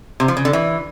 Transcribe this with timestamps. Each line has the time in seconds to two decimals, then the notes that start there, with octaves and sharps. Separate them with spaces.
0.20 C3
0.28 F3
0.37 C#3
0.45 D3
0.53 E3